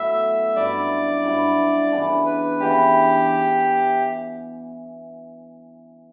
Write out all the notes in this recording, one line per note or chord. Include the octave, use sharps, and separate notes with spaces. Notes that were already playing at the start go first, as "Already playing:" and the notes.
Already playing: A2 F#3 B3 E5
G2 F#3 C#4 E4 D5
G2 F#3 C#4 E4
C#3 E3 B3 D4
B4
C#3 E3 B3 D4 G4